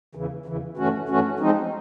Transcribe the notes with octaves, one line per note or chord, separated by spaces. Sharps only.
E2 C#3 E3
E2 C#3 E3
G2 E3 A3 C#4 F#4
G2 E3 A3 C#4 F#4
F3 G#3 C4 D#4